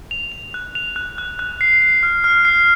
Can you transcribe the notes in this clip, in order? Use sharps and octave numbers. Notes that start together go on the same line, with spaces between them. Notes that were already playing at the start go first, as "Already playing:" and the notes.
F7
F7
F#6
F7
F#6
F#6
F#6
C7
C7
F6
F6
C7